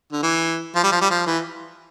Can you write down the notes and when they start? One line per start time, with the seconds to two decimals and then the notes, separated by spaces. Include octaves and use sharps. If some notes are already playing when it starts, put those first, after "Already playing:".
0.12 D3
0.23 E3
0.75 F3
0.83 G3
0.92 F3
1.01 G3
1.10 F3
1.26 E3